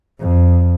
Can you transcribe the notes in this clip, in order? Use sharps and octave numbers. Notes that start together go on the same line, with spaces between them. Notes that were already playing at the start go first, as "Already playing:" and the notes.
F2